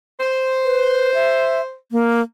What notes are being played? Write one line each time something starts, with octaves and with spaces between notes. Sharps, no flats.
C5
B4
E5
A#3